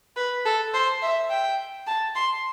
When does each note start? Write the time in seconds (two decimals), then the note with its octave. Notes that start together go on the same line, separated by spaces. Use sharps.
0.16 B4
0.45 A4
0.74 C5
1.02 E5
1.30 G5
1.87 A5
2.15 C6